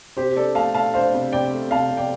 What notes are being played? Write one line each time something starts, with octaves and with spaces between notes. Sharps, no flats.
C3 G4 C5
D4 A4 D5
A3 F5 A5
A3 F5 A5
D4 C5 F5
C3
C3 D5 G5
A3
C3 F5 A5
C3
D5 G5